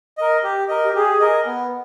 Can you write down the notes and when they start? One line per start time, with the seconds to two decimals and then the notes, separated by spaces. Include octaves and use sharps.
0.18 A#4 D#5
0.43 G4
0.68 A#4 D#5
0.83 G4
0.94 G4 G#4
1.20 A#4 D#5
1.46 B3